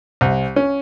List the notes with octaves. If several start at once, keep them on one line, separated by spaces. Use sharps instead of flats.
C2
C#4